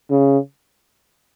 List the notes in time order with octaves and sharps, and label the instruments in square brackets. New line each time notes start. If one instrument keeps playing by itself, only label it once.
[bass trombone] C#3